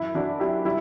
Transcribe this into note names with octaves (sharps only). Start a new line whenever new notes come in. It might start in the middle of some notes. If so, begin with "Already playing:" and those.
Already playing: F#2 E4
F#2 D4 F#4
F#3 E4 G4
G3 E4